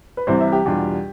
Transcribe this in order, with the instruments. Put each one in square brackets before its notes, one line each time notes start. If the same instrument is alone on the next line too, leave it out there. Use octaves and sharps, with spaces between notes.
[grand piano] B4
[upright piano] C2 C3 E3 G3 [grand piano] C5
[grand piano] E5
G4
[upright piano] E2 B2 G3 D4 F4